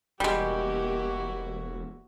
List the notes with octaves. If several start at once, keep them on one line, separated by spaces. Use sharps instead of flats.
E1 G3 G#3 A#3 E4 F#4 G4